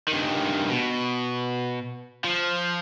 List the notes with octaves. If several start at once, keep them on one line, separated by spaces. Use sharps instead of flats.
G2 D#3
B2
F3